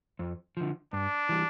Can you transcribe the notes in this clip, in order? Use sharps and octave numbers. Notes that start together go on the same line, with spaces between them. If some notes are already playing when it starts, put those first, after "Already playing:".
F2
D3 F3
G2 D4
E3 G3